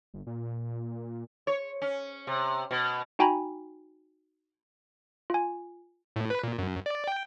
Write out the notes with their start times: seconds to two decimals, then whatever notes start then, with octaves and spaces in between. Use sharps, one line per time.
0.14 G1
0.27 A#2
1.47 C#5
1.82 C#4
2.27 C3
2.71 B2
3.19 D#4 F#4 G5 G#5 A#5 B5
5.30 F4 G#5
6.16 A2
6.30 B4
6.43 A#2
6.58 F#2
6.86 D5
7.07 G5